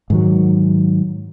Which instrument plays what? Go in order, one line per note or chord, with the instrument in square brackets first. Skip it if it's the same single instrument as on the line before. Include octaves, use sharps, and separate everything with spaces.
[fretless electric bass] G#2 D#3 F#3